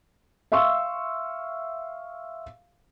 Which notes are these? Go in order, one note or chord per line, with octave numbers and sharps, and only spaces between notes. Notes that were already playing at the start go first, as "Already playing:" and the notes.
E5 F5 C6 C#6 E6